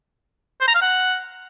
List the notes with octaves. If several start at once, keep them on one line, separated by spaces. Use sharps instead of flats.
C5
A#5
F5
F#5